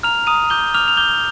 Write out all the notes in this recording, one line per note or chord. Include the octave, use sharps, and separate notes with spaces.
A#5 F6 F7
A#5 D#6 D#7
D6 G6 G7
D6 F6 F7
F7
D6 G6 G7